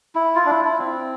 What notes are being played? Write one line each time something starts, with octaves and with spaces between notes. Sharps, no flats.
E4
F4
D4
E4
E4
C4